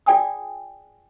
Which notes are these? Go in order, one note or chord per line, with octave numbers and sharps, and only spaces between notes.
F4 G#4 D5 G5 G#5 D#6